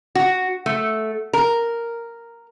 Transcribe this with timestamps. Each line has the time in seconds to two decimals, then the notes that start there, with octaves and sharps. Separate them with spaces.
0.15 F#4
0.66 A3
1.33 A#4